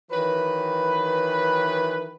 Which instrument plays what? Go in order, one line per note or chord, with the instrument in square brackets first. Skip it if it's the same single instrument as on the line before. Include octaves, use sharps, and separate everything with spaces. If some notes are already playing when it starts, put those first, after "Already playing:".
[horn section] D#3 E3 F#3 B4